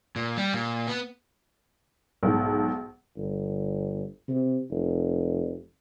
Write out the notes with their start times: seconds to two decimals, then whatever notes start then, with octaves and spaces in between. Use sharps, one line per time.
0.16 A#2
0.37 G3
0.54 A#2
0.87 B3
2.23 B1 G#2
3.17 G1
4.28 C3
4.71 F1